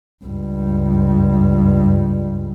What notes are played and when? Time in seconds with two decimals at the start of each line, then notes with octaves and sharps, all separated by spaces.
0.25 C#2 G2